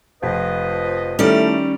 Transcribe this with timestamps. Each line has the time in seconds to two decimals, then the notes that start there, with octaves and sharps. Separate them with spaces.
0.23 F1 F3 B4 D#5
1.19 D#3 G3 A3 C#4 E4 A4 D5 F6